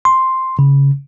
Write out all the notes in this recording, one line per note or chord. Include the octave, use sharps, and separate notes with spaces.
C6
C#3